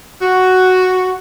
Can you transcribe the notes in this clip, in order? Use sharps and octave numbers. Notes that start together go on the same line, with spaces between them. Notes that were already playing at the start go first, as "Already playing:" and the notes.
F#4